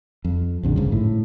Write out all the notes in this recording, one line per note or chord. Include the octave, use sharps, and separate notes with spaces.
F2
A#1 F2 D3
G1 G#2 C#3
A2